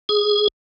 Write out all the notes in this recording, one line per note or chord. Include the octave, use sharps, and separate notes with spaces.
G#4